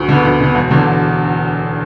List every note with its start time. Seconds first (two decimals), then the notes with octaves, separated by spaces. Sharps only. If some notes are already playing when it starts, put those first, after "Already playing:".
Already playing: D2
0.08 D3 B3
0.25 D2
0.40 D3 B3
0.55 E1
0.71 E2 D3
0.87 E1